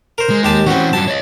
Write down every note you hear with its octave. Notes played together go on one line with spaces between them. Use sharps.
A#4 C5
G#3
D#2 G4 A5
E3 C4 C#4 F#4
G2 F#3 A5
C#5 D#5